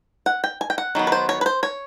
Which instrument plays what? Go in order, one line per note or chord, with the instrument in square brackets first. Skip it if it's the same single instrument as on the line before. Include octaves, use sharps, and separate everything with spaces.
[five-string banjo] F#5
G5
G#5
G5
F#5
D#3 F#3 B3
B4
C5
C#5
B4
C5
C#5